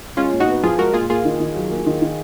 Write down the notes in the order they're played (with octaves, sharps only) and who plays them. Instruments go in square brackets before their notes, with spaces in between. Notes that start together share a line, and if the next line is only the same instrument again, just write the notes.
[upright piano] G#3 [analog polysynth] C#4 F4
[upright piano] A#2
[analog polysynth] D#4 F#4
[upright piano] B3
[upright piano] F3 [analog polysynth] F4 G#4
[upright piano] G#3 [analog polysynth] F#4 A#4
[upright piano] A#2 [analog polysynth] F4 G#4
[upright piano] A#3 [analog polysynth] F4 G#4
[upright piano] D#3
D#3
F#3
A#3
D#3
D#3